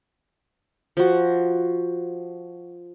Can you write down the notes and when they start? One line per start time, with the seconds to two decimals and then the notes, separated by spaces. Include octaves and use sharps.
0.97 F3 F#4